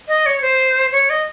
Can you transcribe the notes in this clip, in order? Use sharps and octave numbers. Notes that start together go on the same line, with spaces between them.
D#5
C#5
C5
C#5
D#5